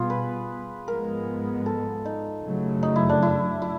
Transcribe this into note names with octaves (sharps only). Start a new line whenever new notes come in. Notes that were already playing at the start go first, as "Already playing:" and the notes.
Already playing: B2 G3 B3 F4 G#4
B4
G#2 F3 G#3 B3 A#4
A4
D#4
F#2 C#3 F#3 A3
D#4
E4
D4
E4
E4